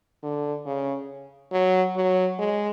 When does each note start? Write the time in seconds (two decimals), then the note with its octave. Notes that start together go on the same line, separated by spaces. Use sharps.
0.23 D3
0.66 C#3
1.52 F#3
1.96 F#3
2.39 G#3